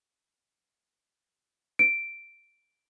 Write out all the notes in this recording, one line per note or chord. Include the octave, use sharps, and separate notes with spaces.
D7